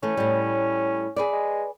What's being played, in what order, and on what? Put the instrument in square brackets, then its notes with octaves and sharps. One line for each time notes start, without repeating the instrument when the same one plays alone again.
[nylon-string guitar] E3 A3 [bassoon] C#4
[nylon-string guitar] A2 G3
G#4 B4 D5
[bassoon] G#3